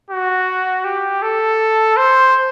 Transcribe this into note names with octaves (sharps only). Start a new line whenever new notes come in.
F#4
G4
A4
C5